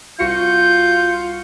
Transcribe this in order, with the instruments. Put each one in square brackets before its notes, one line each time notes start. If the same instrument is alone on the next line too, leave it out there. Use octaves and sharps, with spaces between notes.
[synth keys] C2 F#4 C#7 [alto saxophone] F4 [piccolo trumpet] G6